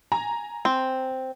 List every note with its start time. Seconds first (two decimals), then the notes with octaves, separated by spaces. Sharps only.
0.12 G#5 A#5
0.65 C4